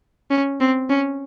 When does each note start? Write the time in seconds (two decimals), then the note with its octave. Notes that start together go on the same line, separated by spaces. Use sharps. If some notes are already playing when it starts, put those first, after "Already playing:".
0.31 C#4
0.60 C4
0.90 C#4